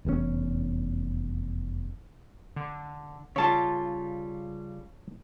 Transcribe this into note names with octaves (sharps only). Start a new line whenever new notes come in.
F1 E2 G#2 C#4
D3
C#3 G3 F4 C#5 A5